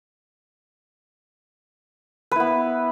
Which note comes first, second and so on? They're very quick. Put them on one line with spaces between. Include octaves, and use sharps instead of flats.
B4 E4 B3